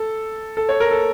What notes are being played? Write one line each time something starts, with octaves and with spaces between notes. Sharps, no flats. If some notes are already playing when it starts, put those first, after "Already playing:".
Already playing: A4
A4
C#5
A#4
A4